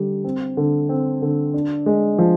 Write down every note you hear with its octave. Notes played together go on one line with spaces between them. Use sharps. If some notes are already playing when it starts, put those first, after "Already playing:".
Already playing: D3 G3
C4
D3
C4
D3
D4
G#3
F3